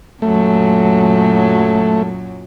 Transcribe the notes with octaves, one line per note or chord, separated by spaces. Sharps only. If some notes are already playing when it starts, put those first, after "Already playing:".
F#2 A#2 F#3 A3